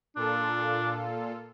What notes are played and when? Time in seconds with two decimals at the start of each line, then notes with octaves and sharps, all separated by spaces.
0.16 A#2 D4 F4 A4